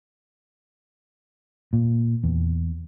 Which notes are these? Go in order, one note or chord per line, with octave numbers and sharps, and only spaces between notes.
A#2
E2